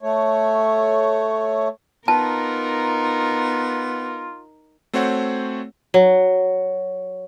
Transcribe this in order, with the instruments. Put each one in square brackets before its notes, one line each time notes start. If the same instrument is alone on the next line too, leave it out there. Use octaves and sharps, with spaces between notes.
[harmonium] A3 C#5
[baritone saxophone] B3 [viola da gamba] D#4 A#4 [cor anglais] F4 [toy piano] A5
[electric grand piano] A3 C4 F#4 C5 C#5 F#5
[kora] F#3